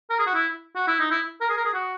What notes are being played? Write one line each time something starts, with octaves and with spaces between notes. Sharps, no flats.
A#4
G#4
F#4
E4
F#4
E4
D#4
E4
A#4
G#4
A#4
G#4
F#4